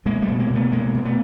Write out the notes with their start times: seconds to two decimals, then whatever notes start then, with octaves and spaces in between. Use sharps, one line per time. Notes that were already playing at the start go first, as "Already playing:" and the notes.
0.05 B2 G#3 A#3
0.22 G3 A3
0.28 B2
0.39 G#3 A#3
0.50 B2
0.55 A3 B3
0.72 B2 G#3 A#3
0.94 B2
1.05 A3 B3